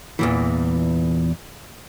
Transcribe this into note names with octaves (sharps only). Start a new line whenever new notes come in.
E2 A#2 E3